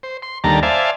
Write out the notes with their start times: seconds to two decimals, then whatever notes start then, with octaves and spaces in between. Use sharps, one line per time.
0.03 C5
0.22 C6
0.44 D#2 D3 G3 A#3 A5 A#5
0.63 C5 D5 E5 F5 G#5 A5